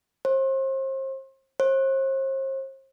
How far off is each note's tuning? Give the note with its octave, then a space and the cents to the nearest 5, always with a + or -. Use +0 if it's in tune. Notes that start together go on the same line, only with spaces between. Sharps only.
C5 +35
C5 +40